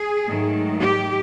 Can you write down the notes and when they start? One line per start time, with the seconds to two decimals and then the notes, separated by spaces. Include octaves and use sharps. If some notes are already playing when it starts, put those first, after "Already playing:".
Already playing: G#4
0.26 G#2 D#3 F#3 A3
0.79 G4